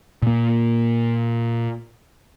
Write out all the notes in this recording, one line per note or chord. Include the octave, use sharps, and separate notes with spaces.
A#2 A#3